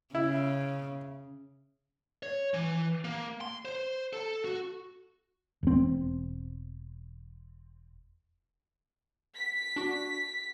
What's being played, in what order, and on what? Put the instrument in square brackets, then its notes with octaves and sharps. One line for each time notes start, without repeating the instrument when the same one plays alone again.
[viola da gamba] C#3 [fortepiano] E4
[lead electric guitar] C#5
E3
A#3
C6
C5
A4
F#4
[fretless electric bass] E1 C4
[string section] B6
[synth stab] D4 F#4